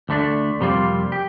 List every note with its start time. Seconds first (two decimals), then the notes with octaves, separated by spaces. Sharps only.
0.09 D2 D3 A3 D4
0.60 F2 C3 G3 A#3 F4
1.12 G4